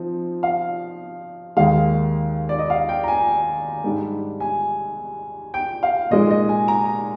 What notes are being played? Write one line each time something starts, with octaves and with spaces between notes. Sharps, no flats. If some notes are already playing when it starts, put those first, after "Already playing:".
Already playing: F3 C4 D#4
F5
D#2 D#3 G#3 F5
D5
D#5
F5
G5
A#5
G#5
G#2 G3 D4
G#5
G5
F5
A#2 G#3 D#4 D#5
D#5
G#5
A#5